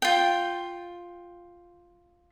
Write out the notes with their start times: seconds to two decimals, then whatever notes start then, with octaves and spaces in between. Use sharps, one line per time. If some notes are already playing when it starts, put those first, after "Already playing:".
0.02 F4 G5